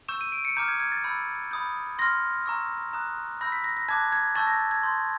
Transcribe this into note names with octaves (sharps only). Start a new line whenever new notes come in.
C#6 E6 G6 E7
D#7
D7
C#7
A#5 D6 F6 G6
G#6
G#6
A6
B5 E6 G6
B5 D#6 G6
C6 F6 A#6
A#5 C#6 E6
A#5 D#6 F#6
B5 E6 G6 A#6
B6
A#6
A#6
A5 D6 F#6 G#6
G#6
A5 C#6 E6 G6 A6
A#6
A6
G#6
C6 D#6 G6